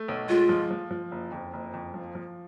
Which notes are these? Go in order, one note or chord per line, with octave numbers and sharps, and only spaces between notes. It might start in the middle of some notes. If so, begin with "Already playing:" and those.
Already playing: A3
B1
G#3 F4
F3
F3
F3
F#1
F2
F#1
F2
F3
F3